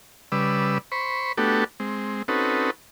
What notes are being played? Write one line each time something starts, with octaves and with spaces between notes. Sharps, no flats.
C#3 G3 B4 D5 E6
C5 B5 C#6
A3 B3 D4 F#4 G4 A4
G#3 C4
C4 C#4 D#4 F#4 A4 B4